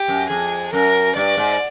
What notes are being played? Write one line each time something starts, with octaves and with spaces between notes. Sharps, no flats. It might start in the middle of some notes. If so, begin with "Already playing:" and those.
Already playing: G4
F#2
F2 G#4
F#2 A#4
G2 D5
G#2